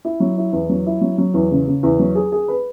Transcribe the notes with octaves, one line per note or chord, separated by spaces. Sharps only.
E4
F#3
E4
E2
F#3
E4
F#3
F#3
E2
C#3
C#3
E2
F#3
G#4
G#4
B4